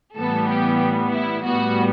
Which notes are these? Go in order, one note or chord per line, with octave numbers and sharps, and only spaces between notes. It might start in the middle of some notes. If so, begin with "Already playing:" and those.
A2 E3 G3 B3 A4
G4
E4
A2 G3 B3 F#4